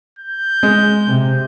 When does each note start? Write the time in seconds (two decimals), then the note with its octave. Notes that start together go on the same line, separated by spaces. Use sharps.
0.19 G6
0.63 G#3
1.08 C3